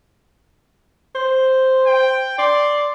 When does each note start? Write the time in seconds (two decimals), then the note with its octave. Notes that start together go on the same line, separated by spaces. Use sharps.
1.15 C5
1.87 G5
2.38 D5 C6